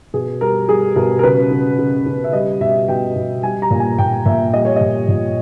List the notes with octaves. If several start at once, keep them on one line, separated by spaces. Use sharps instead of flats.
B2 G#4
G3 A#4
G3 G#4
B2 A#4
A#4
C#3 B4
C#3
C#3
C#3
E5
G3 D#5
B2 E5
B2 G5
B2
G3 G#5
A#5
A#2
G#5
A#2 G5
A#2 E5
G3 D#5
C#5
A#2 D#5
A#2